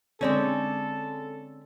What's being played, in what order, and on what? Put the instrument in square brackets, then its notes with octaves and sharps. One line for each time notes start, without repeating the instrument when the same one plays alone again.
[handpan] D3 D5 [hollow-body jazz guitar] G#3 C4 C#4 [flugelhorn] A4